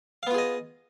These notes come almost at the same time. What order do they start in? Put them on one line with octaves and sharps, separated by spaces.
F5 B3 F4 G#4 D#5